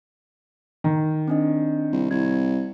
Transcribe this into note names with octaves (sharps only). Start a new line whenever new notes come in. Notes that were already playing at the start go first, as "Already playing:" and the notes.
D#3
C4 D4 D#5
C2
C2 G#6